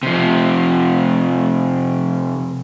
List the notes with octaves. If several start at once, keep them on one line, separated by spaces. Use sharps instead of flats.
C3 F3